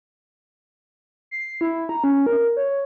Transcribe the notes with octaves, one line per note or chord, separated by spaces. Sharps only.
C7
E4
A#5
C#4
A#4
C#5